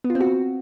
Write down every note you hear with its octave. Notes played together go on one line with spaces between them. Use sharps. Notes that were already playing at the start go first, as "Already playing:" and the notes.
B3
F4
C4
F#4